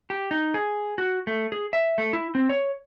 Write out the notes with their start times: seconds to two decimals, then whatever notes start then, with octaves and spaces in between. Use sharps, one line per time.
0.10 G4
0.31 D#4
0.54 G#4
0.98 F#4
1.27 A3
1.52 G#4
1.73 E5
1.98 A3
2.13 E4
2.35 C4
2.49 C#5